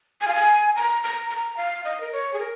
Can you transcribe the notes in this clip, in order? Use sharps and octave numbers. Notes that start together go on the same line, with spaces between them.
G#5
F5
G#5
A#5
A#5
A#5
F5
D#5
A#4
C#5
G#4
A#4